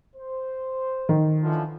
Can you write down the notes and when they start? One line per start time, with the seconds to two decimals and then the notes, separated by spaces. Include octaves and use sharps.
0.16 C5
1.09 D#3
1.42 D3 E3 F3